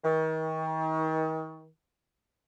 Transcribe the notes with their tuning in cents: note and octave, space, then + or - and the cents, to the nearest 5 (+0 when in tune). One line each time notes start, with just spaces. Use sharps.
D#3 +35